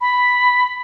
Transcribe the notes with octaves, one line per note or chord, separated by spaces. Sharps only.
B5